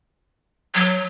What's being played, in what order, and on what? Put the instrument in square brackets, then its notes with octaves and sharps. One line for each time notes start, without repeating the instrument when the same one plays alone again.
[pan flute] F#3